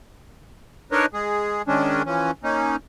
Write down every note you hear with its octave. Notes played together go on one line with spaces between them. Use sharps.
D4 D#4 A#4 B4 C#5 D#5
G#3 G#4
D#3 G#3 C#4 D4
E3 F3 C#4
A#3 C#4 D#4